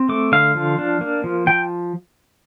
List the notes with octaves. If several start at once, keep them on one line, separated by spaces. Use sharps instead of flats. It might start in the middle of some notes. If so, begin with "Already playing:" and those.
Already playing: C4
A3 D6
D3 F5
F3
D4
A#3
F3
F3 G5